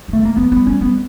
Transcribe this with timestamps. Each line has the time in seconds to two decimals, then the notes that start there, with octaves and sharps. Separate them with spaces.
0.08 D#3
0.13 A3
0.22 D#3 A#3
0.37 F3 B3
0.52 G3 B3
0.66 G3 C#4
0.81 G3 B3